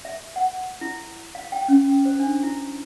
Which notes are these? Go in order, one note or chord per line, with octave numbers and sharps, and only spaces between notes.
E5
F#5
E4
F5
G5
C#4
C5
D4
E4